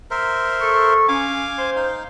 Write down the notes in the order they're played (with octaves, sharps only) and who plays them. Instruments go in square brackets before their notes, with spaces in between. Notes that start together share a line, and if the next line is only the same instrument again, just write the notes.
[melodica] A#4 C5 E5
[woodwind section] A4 C#6
[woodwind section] C#4 [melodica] F5 G#5 D6
[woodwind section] C5 C6
[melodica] D#4 F5